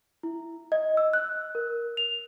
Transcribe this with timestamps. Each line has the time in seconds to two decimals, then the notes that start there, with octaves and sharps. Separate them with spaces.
0.23 E4
0.72 D#5
0.97 E6
1.13 F#6
1.55 A#4
1.97 F7